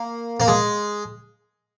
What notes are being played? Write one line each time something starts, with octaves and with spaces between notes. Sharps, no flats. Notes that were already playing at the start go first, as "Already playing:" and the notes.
Already playing: A#3
A#3
G#3